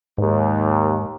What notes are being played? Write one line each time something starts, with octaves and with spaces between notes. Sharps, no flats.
D#2 G#2